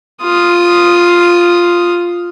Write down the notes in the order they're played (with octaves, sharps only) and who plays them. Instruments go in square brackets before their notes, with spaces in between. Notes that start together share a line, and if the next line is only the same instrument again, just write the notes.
[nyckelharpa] F4 D#6